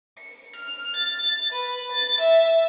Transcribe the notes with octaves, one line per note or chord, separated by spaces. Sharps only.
C#7
F6
A6
B4
A6
E5